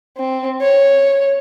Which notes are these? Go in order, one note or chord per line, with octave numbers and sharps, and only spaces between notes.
C4
C#5